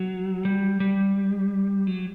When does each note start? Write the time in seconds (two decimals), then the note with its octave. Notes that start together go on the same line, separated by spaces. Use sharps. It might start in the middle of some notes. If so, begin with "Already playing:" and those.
Already playing: F#3
0.45 G3
0.80 G3
1.87 F#3